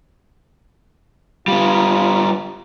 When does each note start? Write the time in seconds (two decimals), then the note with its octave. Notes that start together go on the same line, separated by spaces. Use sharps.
1.48 G3 B3 F4